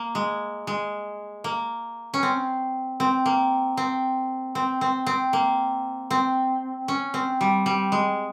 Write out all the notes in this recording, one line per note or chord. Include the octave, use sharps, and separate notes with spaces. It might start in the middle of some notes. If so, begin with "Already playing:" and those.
Already playing: A#3
G#3
G#3
A#3
C#4
C4
C4
A#3
C4
C4
C4
C4
A#3
C4
C#4
C4
G3
G3
G#3